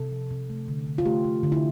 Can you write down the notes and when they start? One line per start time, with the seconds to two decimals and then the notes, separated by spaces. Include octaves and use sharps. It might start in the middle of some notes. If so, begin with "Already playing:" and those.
Already playing: C3 A4
0.11 F3
0.31 C3
0.50 A3
0.68 D3
0.87 D3
0.98 F4
1.05 A3 G4
1.24 A3
1.43 D3
1.52 E4